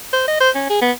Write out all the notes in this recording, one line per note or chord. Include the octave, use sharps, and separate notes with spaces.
C5
D#5
C5
C#4
G#4
B3